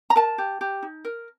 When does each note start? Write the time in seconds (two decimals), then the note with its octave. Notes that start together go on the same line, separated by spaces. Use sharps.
0.10 A#5
0.16 A#4 A5
0.38 G4
0.61 G4
0.82 D#4
1.05 A#4